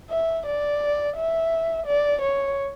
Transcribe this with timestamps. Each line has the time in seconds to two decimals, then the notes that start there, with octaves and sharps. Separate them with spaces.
0.10 E5
0.46 D5
1.16 E5
1.87 D5
2.22 C#5